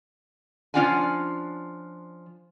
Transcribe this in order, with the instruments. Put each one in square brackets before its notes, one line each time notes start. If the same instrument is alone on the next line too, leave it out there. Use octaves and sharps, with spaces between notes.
[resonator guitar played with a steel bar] F3 C#4 D4 F4 F#5 G#5